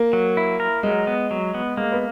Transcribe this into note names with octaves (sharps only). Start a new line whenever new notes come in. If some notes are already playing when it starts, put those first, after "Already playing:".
Already playing: A#3
F#3
E4
A#4
F#3 G#3
B3
F#3
B3
G#3 A#3
B3